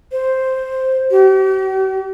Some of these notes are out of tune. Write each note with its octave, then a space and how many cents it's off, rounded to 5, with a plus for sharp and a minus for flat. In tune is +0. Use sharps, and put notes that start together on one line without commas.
C5 +0
G4 -45